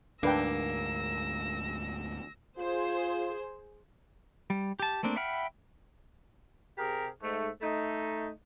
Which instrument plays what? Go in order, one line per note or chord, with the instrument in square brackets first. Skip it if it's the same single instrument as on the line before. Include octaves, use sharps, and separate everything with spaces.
[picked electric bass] D2 G#2 [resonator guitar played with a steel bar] A#3 [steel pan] D4 B4 G5 [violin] E6 A#6
[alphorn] F4 [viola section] G#4 C5
[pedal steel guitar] G3
G4 A5
A3 A#3 C4 D4
E5 F#5 G5 B5 F6
[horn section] C3 G4 G#4 A#4
G#2 A3
A3 D#4